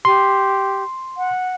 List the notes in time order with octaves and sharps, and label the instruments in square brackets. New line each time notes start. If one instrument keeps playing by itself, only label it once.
[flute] G4 [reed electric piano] C6
[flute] F#5